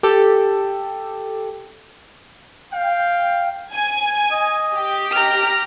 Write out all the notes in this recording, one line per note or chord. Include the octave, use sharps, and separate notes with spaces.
G4 A4
F5 G5
G#5
D#5
G4
A#5 F6